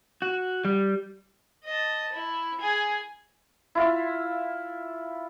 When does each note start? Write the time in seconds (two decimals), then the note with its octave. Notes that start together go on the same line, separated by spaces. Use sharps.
0.22 F#4
0.65 G3
1.65 D#5 A5
2.12 E4
2.61 G#4 G#5
3.75 E4 F4 E5